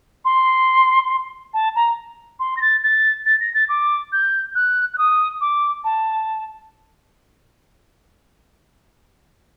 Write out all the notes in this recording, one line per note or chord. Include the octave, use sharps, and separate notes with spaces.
C6
A5
A#5
C6
A#6
A6
A6
A6
A#6
A6
D6
G6
F#6
F#6
D#6
D6
A5